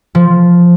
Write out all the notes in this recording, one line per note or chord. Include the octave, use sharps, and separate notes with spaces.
F3